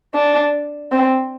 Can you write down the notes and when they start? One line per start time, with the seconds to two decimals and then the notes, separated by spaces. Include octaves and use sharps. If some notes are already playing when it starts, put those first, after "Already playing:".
0.15 D4
0.92 C4